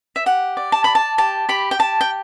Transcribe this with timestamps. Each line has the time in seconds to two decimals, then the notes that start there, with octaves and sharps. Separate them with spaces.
0.16 E5
0.26 G4 F#5
0.57 D5
0.72 A5
0.84 D5 B5
0.95 A5
1.18 G4 A5
1.49 G4 B5
1.71 G5
1.79 G4 A5
2.01 G5